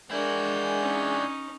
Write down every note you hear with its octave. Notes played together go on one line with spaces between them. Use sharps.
G#3 D4 E4 F#4 A#4 G#5 G6
C#4 D#4